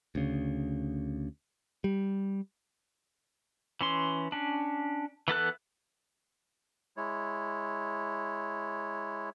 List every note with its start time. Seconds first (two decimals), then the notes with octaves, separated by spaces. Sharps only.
0.15 D2 C#3
1.84 G3
3.81 E3 C#4 C6
4.32 C#4 D4
5.28 E3 B3 A4 F#6
6.97 G#3 E4 C#5